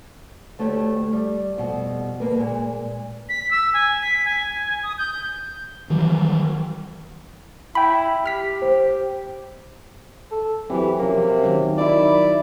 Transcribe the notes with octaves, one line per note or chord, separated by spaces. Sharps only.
D2 A3 G4 C#5
G3
F2 B2 G3
D2 A#3 B4
A#2 G#3
B6
E6
G#5
B6
G#5
D#6
G6
D#3 E3 F#3 G3
E4 G5 B5
G4 F6 B6
C5
A4
E3 F#3 C4 G4
C3 F3 A#3 C#4
D#3 F#3 C#4
D#3 F#3 D#4 E4 D5